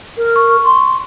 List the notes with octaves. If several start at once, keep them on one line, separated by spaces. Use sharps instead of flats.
A#4
C#6
C6